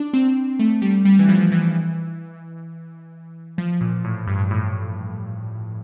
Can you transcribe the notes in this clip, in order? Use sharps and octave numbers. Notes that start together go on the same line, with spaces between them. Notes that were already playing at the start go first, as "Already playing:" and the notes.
Already playing: D4
C4
A3
G3
G3
E3
F3
E3
F3
A#2
A2
G2
A2